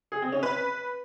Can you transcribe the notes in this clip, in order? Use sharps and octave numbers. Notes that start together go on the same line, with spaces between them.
G#4
C4
C#4
B4